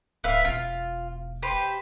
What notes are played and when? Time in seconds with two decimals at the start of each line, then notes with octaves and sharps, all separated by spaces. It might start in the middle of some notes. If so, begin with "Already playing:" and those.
0.24 D1 B4 E5 F5
0.45 E1 F4
1.42 G4 B4 C5